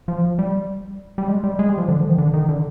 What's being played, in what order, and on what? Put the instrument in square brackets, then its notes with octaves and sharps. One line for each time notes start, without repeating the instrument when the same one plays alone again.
[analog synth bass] F3
G3
G3
G#3
G3
G#3
G3
F3
D3
F3
D#3
D3
D#3
D3